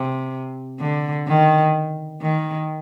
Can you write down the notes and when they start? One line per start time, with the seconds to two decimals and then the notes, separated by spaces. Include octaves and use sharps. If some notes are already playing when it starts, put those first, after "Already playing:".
Already playing: C3
0.79 D3
1.27 D#3
2.21 D#3